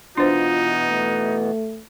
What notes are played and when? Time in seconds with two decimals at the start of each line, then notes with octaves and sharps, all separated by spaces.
0.18 B2 E3 B3 D4 D#4 F4 C5
0.89 A3